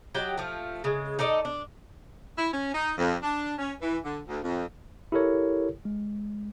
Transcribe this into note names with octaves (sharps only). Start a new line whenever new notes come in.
F#3 G4 D#5 G5
F3 A3
C#3 G#3
D#4 A4 D5 D#5
D4
E4
C#4
D#4
F2
D4
C#4
E3
D3
D2
F2
E4 G4 A4 A#4 C#5
G#3